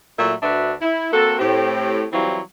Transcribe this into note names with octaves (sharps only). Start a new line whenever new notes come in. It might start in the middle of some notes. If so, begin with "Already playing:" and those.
A#2 F#3 A3 E4 E5
D2 D4 F#4 B4 E5
E4
A#3 C4 F#4 A4
A2 C4 G4
E3 F#3 G3 C4 E4 F4